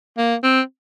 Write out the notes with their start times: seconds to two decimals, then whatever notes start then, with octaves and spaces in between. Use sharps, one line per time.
0.18 A#3
0.43 C4